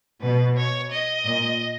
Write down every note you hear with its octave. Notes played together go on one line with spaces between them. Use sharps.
B2 B4
C#5
D#5
A#2